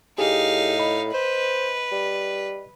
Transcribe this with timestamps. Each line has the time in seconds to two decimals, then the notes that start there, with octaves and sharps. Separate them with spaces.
0.18 A2 D#4 G4 G#4 F5
0.79 D#5 B5
1.13 B4 C5
1.91 G3